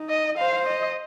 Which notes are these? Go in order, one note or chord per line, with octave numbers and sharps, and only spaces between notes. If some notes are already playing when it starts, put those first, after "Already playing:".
Already playing: D#4
D#5
C5 F5
D#5